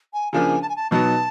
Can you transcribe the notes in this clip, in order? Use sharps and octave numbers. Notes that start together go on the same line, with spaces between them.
G#5
C#3 F3 A#3 D4 G#5
A5
G#5
A5
B2 F#3 B3 D#4 A5